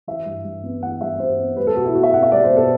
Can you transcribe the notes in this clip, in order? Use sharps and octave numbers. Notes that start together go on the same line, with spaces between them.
E3 E5
G2
G2
B3
E3 F#5
G2 E5
G2 C5
B3
G3 B4
A4
B2 F#4
E4
B2 F#4
E5
B3 F#5
E5
G3 D5
C5
B2
A4